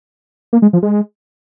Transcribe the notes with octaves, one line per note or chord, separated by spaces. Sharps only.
A#3
G#3
F3
G#3